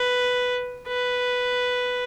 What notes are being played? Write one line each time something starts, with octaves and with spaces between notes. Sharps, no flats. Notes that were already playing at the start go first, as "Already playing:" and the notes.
Already playing: B4
B4